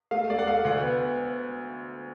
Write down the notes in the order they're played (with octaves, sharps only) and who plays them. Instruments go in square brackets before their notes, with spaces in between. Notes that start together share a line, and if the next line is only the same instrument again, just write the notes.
[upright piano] A3 F5
A3 D5
F#5
A3 F5
D2 F#5
B3